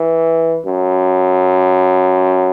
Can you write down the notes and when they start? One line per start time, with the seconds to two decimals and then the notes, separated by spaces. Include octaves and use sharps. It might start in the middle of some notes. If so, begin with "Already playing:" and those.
Already playing: E3
0.66 F#2